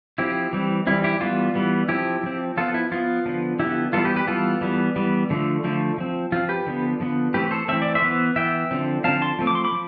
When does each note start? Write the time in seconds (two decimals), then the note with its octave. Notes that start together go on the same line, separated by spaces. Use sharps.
0.18 F3 C4 E4 G4
0.53 E3 G3 C4
0.87 E3 G3 C4 E4
1.04 E4 G4
1.20 E3 G3 B3 F4
1.55 E3 G3 B3
1.89 F3 C4 E4 G4
2.23 F3 C4
2.57 F3 B3 F4 A4
2.74 E4
2.92 F3 B3 F4
3.26 D3 F3 B3
3.59 D3 F3 B3 E4 G4
3.93 E3 G3 B3 F4 A4
4.05 G4 B4
4.16 G4 B4
4.27 E3 G3 B3 F4 A4
4.61 E3 G3 B3
4.96 E3 G3 B3
5.30 D3 F3 A3
5.64 D3 F3 A3
5.98 F3 C4
6.32 F3 C4 F4
6.49 G4 B4
6.67 D3 F3 B3
7.00 D3 F3 B3
7.34 E3 A3 C4 G4 B4
7.51 A4 C5
7.68 E3 A3 C4 E5
7.82 D5
7.95 C5 E5
8.02 E3 B3
8.36 E3 B3 E5 G5
8.71 D3 F3 C4
9.04 D3 F3 C4 F5 A5
9.22 A5 C6
9.39 F3 A3 C4
9.47 D6
9.55 C6
9.64 B5 D6
9.73 F3